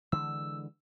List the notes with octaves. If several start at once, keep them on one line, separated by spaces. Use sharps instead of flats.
D3 E3 G#3 E6